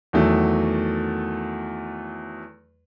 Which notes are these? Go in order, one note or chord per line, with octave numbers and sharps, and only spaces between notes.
E2 D#3 F#3 A3